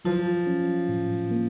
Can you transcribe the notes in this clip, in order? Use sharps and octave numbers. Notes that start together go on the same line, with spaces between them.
F3 F#3
C#4
A2
A#3